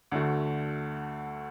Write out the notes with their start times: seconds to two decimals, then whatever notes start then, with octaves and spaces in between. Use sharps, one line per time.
0.12 D2 D3 A3 F#4